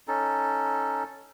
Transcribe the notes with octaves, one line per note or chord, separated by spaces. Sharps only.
C#4 D#4 A4